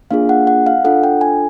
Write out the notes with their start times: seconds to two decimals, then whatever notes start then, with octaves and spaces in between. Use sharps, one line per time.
0.11 A#3 D4 F4 G#4 F5
0.29 F#5
0.47 F#5
0.66 F5
0.84 D4 F4 A4 F#5
1.03 G5
1.21 G#5